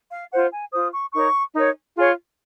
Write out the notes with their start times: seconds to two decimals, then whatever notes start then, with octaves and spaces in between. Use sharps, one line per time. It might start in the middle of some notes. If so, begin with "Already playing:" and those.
0.11 F5
0.31 F4 C5 F#5
0.52 G#5
0.72 F4 C5 D#6
0.93 C#6
1.13 D#4 A#4 C#5 C#6
1.54 D#4 A#4 C#5
1.95 F4 G#4 C#5